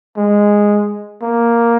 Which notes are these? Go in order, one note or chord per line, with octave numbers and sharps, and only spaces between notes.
G#3
A#3